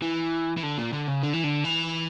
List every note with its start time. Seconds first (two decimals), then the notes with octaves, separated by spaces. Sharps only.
0.02 E3
0.57 E3
0.63 D3
0.78 A#2
0.93 D3
1.09 C#3
1.23 D3
1.33 E3
1.44 D3
1.64 E3